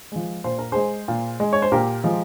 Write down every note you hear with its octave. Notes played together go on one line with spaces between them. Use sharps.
F3 G#3
A#2 C5
A#4
G#3 G#4 C5
A#2
G#3
C#5
C5
A#2 G4 A#4
F3 G#3